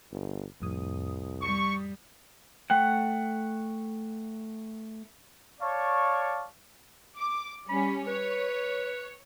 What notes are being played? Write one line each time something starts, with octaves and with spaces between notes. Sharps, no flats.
G1
C2 F2 A2 D#6
G3 C#6
A3 F#5 G5
C#5 D5 F5 A5 C#6
D6
G3 C#4 B5
B4 C#5